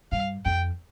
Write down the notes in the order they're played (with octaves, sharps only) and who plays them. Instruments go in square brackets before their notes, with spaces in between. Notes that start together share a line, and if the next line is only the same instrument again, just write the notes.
[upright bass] G2 [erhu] F5
[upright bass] F2 [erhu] G5